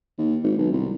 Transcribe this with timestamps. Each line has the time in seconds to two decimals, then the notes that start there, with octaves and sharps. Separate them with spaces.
0.18 D#2
0.43 G#1
0.58 B1
0.72 C2